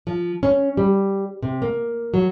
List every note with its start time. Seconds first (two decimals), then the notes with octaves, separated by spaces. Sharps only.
0.07 F3
0.43 C#4
0.77 G3
1.42 C3
1.62 A#3
2.14 F#3